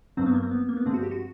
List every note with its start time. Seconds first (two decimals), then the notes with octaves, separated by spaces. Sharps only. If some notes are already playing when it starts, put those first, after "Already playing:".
0.17 G2 D3 F#3 C4
0.26 B3
0.35 A#3
0.43 C4
0.51 B3
0.69 A#3
0.77 B3
0.85 G2 D3 F3 G#3 C4
0.94 F#4
1.03 G4
1.11 F#4